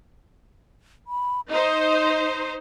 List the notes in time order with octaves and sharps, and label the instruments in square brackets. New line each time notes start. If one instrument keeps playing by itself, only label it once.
[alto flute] B5
[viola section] D#4 C5 [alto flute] D#5